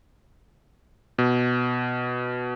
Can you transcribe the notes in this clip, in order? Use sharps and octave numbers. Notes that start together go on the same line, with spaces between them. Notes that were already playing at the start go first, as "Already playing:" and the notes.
B2